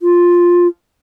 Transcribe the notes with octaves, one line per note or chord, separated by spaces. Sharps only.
F4